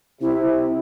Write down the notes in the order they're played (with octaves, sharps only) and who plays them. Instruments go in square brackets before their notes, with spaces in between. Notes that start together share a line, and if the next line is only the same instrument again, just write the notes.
[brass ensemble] C3 [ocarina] E4